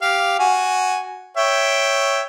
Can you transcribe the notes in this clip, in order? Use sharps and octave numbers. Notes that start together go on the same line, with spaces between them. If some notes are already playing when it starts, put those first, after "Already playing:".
G4 F5
F#4 G#5
C#5 E5 G5